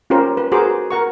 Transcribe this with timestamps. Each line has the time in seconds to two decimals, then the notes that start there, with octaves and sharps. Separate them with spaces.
0.10 C#4 F4 G4 A#4 C5
0.37 B4
0.52 F#4 G#4 A#4 C5 D6
0.91 A#4 F#5 C#6